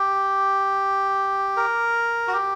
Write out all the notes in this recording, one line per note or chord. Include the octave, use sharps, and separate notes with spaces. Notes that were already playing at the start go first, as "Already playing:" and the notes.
Already playing: G4
A#4
F#4
G4